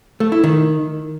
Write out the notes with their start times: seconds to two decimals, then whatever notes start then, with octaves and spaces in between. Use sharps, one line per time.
0.20 A3
0.32 E4
0.44 D#3